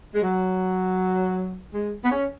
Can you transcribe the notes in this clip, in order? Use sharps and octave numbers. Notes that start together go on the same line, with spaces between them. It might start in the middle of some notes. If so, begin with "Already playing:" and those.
G#3
F#3
G#3
B3
C#4